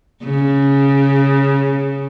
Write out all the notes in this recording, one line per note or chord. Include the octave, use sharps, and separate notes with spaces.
C#3